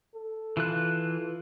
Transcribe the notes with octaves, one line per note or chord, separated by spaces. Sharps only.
A4
E3 F4 F#6